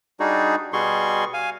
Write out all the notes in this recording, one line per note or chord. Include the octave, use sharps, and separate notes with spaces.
G3 D4 D#4 F#4 G#4
B2 G3 F#4 G#4 C6 C#6
F5 G#5